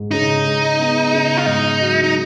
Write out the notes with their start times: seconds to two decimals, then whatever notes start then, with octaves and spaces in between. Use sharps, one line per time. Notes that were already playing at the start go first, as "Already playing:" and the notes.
Already playing: G#2
0.11 C#3 D#4
0.45 G#3
0.80 B3
1.13 C#3
1.37 F4
1.46 G#2 D#4
1.81 F#3
2.04 D#4